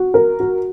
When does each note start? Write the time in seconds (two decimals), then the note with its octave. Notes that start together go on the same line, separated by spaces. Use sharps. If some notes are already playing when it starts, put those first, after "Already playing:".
Already playing: F#4
0.14 A#4
0.40 F#4